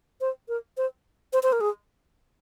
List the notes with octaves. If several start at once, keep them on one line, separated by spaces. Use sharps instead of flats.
C5
A#4
C5
C5
C5
A#4
G#4